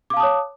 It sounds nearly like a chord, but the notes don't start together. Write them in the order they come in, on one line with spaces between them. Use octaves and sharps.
D6 F5 A5 D#6 C#5